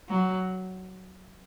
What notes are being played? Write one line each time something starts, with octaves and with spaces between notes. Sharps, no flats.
F#3